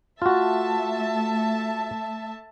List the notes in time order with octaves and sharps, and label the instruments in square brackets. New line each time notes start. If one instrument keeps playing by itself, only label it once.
[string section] A3 E5 A5 [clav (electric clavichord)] F4 F#4